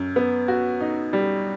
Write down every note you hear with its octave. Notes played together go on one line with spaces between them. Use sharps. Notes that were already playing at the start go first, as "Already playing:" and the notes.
Already playing: F#2
B3
F#4
D#4
G3